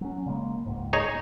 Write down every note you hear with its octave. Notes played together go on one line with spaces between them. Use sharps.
F#3 C#4
C#3 G#3 A#3
C#2 G#2
D#4 G#4 C#5